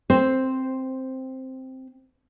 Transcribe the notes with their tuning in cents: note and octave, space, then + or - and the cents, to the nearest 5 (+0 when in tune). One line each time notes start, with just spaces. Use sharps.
C4 +0 C5 +0